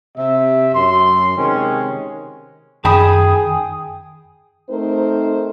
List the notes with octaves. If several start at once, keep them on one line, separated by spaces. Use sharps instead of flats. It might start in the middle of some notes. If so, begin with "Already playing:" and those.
C3 E5
F#2 C6
C3 D#3 G#3 C#4
F#2 D#3 G#4 G5 A5 B5 D#6
A3 C4 D#4 A#4 C5